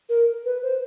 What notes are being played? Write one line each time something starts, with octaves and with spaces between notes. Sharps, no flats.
A#4
B4
C5